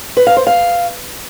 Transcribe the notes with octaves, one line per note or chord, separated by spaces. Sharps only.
B4
F5
C5
F5